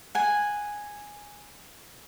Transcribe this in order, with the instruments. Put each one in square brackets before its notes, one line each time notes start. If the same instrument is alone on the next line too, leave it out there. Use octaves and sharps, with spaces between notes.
[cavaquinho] F#5 G#5